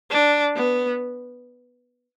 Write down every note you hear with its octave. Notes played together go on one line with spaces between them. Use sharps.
D4
B3